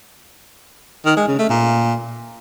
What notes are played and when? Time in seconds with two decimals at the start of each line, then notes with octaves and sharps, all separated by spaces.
1.06 D#3
1.17 G#3
1.28 C#3
1.39 A3
1.50 A#2